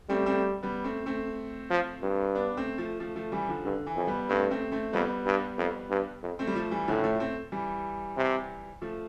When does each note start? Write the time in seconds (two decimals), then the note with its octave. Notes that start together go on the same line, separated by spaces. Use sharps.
0.09 G3 A3 C4
0.26 A3 C4
0.63 G3 B3
0.84 A3 C4
1.06 A3 C4
1.71 F3
2.03 G2
2.35 B3 D4
2.57 A3 C4
2.78 F3 A3
3.00 F3 A3
3.16 F3 A3
3.32 E3 G3
3.49 D3 F3
3.64 G2 D3
3.86 E3
3.97 F2
4.07 G3 B3
4.29 G2 A3 C4
4.51 A3 C4
4.72 A3 C4
4.93 F2 G3 B3
5.26 G2
5.58 F2
5.90 G2
6.23 F2
6.39 A3 C4
6.47 G3
6.55 F3 A3
6.71 E3 G3
6.88 A2 D3 F3
7.04 F3 A3
7.20 A3 C4
7.52 E3 G3
8.17 C3
8.82 F3 A3